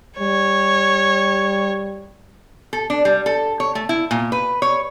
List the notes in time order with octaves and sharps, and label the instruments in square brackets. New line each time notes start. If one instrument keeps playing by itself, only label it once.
[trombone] G3 [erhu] C#5
[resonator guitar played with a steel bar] A4
D4
G3
A4
C#5
A3
E4
A#2
B4
C#5